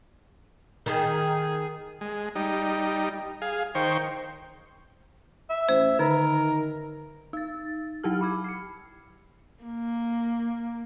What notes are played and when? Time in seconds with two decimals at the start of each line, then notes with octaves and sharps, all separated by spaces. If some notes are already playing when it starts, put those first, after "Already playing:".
0.86 D#3 G#4
2.01 G#3
2.35 G3 D#4
3.42 G#4 F5
3.75 D#3 C5 G5 C#6
5.50 E5
5.69 A1 C5
5.99 D3 D#3 A#4
7.33 D#4 A6
8.03 F#3 D#4 E4 G4 F6
8.21 B5 D6 G#6
8.44 C7 C#7
9.64 A#3